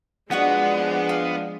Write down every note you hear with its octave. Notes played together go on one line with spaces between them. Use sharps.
F3 G#3 B3 D4 F#4 D#5 F#5
F5